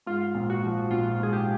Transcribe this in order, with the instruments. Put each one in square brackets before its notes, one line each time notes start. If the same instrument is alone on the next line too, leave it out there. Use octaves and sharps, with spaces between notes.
[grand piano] G#2 [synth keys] F4
[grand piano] A#1
[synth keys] F#4
[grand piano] F3
[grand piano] A#1 [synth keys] F4
[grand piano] G#2 [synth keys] G#4
[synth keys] G4